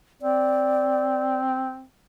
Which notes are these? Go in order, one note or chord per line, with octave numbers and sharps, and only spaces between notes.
C4 D5